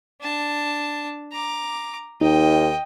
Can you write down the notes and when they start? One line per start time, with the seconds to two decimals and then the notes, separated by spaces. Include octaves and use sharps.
0.21 D4 A5
1.32 A#5 D6
2.21 D#2 D#4 D#5 G5